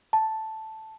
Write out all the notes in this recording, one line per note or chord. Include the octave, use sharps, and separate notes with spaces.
A5